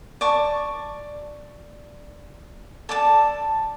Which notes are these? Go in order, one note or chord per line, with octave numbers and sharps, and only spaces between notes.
D5 A5 C#6
A4 D5 A5